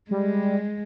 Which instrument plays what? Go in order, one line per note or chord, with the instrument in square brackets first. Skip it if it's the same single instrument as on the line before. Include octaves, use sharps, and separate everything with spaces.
[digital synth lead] G3 [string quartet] G#3